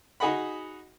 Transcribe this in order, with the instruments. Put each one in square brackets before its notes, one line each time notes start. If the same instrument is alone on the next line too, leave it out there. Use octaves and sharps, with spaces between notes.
[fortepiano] D#4 F#4 G#4 D#5 F#5 B5